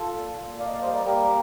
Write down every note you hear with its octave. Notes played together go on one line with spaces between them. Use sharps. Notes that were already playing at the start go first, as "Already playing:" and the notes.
Already playing: F4 A4
A#2
A#2
A#3 D5 F5
D#5
D5 F5
G3 C5 D#5
A#4 D5
A#3 G4 A#4